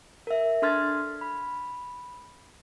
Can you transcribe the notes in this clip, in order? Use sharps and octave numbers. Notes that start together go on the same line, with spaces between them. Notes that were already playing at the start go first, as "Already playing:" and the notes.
A#4 E5
D4 A4 C6 F6 G#6 A6
B5